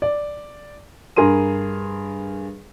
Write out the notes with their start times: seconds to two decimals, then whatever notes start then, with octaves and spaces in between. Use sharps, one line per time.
0.02 D5
1.16 G2 G#4 A#4 C6 D#7